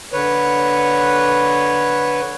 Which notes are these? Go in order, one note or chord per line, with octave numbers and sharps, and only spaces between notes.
D3 B4 C#5